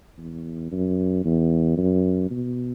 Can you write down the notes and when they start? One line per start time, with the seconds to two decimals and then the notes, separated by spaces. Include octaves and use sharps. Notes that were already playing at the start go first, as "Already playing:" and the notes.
0.18 E2
0.72 F#2
1.25 E2
1.77 F#2
2.31 B2